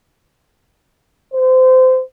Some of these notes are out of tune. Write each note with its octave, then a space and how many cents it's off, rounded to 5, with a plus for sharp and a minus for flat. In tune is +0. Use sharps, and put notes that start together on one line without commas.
C5 -25